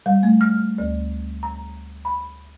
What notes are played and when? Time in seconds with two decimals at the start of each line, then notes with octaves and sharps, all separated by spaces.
0.06 G3
0.23 A3
0.41 F6
0.78 D2
1.43 A#5
2.05 B5